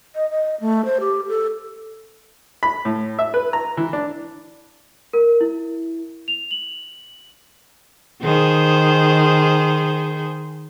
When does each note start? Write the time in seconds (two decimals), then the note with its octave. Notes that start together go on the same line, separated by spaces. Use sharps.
0.15 D#5
0.31 D#5
0.61 A3
0.85 C5
1.00 G4
1.28 A4
2.63 B5
2.85 A2
3.19 E5
3.34 B4
3.53 A#5
3.77 E3
3.93 D4
5.14 A#4
5.41 E4
6.28 F7
6.51 F#7
8.23 D#3 G#4 C5